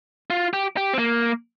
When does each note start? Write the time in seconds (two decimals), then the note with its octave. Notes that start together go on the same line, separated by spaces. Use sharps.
0.30 F4
0.53 G4
0.77 G4
0.93 C4
0.99 A#3